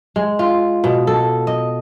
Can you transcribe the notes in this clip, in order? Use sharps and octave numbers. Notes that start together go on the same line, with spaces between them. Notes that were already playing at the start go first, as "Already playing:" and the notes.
G#3
F4
B2
A4
D#5